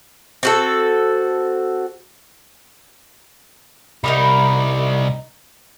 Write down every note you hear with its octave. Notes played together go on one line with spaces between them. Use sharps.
C4 F#4 A4
C2 G3 D#4 A#4 B5